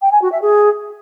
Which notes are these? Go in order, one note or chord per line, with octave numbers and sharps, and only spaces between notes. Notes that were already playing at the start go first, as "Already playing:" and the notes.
G5
G#5
F#4
E5
G#4